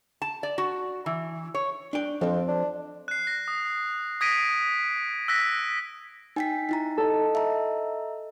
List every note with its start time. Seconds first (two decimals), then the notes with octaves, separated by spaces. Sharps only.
0.22 A5
0.43 D5
0.58 F#4
1.06 E3
1.54 C#5
1.93 D4 G5
2.21 F2 F3 C4
2.48 D4
3.08 F#6 C7
3.27 A#6
3.48 D#6
4.21 D#6 G#6 A#6 B6 D7 D#7
5.28 E6 F#6 A#6 B6
6.36 D#4 G5 G#5 B6
6.69 D#4 E4 A#5
6.98 A4 D#5
7.35 E5 A#5